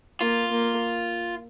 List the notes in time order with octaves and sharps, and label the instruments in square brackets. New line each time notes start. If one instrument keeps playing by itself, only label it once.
[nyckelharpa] A#3 [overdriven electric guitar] F4
[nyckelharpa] A#3